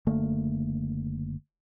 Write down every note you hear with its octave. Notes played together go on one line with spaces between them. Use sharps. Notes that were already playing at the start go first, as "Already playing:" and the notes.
F#1 D3 A3 A#3